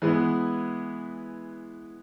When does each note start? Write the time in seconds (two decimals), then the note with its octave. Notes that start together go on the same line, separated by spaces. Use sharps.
0.02 E3 G#3 B3